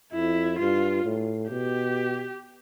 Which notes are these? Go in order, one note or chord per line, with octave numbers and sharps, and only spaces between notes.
F2 E4
G2 F4
A2
B2 G4